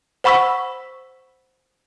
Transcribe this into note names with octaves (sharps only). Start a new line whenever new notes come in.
C5 F#5 B5 C#6 E6 B6